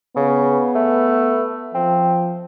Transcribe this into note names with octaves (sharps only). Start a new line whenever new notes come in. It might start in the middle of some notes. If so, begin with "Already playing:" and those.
C#3 B3
A3
F3 C4